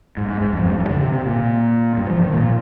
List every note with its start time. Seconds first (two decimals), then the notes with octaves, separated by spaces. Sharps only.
0.17 G#2
0.29 G#2
0.41 G#2
0.53 F2
0.57 G#2
0.62 G2
0.71 F2
0.80 G2
0.89 D3
1.01 C3
1.13 C3
1.26 A#2
1.97 G2
2.10 F3
2.23 D#3
2.34 A#2